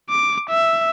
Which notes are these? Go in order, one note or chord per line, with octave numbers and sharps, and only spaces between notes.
D6
E5